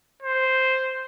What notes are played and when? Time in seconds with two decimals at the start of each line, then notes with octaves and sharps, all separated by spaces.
0.22 C5